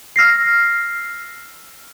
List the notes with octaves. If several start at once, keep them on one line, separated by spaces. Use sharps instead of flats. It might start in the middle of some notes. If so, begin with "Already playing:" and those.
E6 F6 A#6 C7